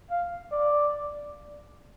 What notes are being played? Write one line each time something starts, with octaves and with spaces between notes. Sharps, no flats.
F5
D5